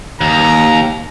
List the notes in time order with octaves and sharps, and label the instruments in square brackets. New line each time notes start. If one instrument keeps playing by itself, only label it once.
[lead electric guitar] D#2 [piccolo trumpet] A#5